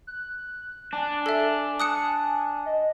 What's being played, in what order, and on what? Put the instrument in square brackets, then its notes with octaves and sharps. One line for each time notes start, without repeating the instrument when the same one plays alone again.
[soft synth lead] F#6
[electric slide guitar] D4 [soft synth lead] G#5
[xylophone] A4 E5
[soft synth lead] G#5 [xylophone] D#6 F#6 C#7
[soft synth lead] D#5